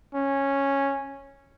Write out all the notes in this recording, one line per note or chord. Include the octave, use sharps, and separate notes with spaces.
C#4